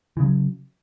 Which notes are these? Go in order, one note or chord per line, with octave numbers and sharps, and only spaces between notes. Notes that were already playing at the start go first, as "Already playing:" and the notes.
C#3 E3 F#3